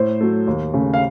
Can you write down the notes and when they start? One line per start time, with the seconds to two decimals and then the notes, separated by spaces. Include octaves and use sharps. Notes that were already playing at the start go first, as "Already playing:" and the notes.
Already playing: A2 C5
0.21 F#3 A3
0.47 D#2
0.74 C#3 A3
0.94 F5